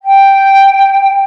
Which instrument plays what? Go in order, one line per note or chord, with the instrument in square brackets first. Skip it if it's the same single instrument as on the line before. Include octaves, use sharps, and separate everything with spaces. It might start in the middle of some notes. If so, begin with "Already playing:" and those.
[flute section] G5